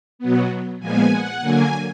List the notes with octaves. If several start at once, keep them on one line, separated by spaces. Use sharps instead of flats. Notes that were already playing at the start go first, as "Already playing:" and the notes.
B2 F#3 B3
A#2 F3 G#3 B3 G#5
F#5
D3 F#3 A#3 G#5